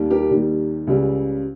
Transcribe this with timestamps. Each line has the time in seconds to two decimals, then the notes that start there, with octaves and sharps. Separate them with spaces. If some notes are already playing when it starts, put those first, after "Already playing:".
Already playing: D#2 D#3 G3
0.11 G4 A#4
0.30 D#2 D#3 G3
0.87 C#2 C#3 G3